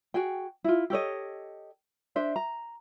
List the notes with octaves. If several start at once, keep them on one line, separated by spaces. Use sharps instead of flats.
F#4 G#4 G5
E4 F4
G4 A4 C#5 D#5
D4 C5 E5
A#5